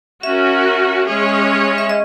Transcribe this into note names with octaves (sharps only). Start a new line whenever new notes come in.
C#4 F#4 A#4 E5
G#3 C#4 G#4 C#5
E5
D#5